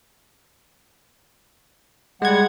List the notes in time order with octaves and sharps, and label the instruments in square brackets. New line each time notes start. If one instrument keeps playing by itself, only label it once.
[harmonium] G3 F#5 [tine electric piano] G#3 G#6